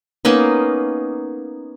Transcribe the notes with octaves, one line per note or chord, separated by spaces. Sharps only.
A#3 B3 C#4 D#4